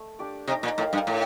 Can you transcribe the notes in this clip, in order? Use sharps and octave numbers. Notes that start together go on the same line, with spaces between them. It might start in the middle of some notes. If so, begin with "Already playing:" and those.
Already playing: A3
D4 G4 D5
C3 D#4
A#2
A2 A#4 D5 F5
G2
A2 D#4